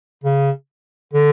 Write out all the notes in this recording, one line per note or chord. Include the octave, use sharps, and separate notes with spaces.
C#3
D3